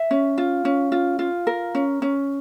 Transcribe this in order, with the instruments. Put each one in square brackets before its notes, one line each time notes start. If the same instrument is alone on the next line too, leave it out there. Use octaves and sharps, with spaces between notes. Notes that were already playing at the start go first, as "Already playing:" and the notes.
Already playing: [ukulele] E5
C#4
F4
C#4
F4
F4
A#4
C#4
C#4